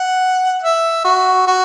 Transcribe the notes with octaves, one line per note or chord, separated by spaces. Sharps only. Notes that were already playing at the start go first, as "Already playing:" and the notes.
Already playing: F#5
E5
F#4
F#4